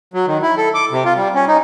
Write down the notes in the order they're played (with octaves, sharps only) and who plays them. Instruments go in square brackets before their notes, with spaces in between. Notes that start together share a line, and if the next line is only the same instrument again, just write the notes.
[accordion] F#3
D#3
E4
A4
D6
C3
F4
G3
C#4
D#4